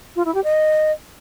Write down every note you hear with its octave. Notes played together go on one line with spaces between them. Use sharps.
F4
E4
G4
D#5